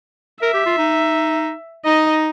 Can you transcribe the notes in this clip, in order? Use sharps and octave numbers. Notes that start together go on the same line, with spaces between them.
A#4 E5
G4
F4
D#4
D#4 D#5